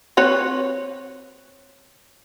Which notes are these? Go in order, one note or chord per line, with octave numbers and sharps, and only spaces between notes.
C4 B4 C#5